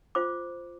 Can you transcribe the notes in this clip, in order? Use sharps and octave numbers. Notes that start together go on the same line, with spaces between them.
F4 C5 D6